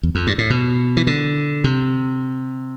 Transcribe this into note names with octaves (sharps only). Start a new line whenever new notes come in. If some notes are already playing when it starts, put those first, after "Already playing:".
E2
F2
G2
A2
B2
E3
D3
C3